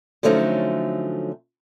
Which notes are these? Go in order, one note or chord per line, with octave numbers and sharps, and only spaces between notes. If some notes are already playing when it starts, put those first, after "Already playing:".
D3 F3 F#3 A3 C#4 D#4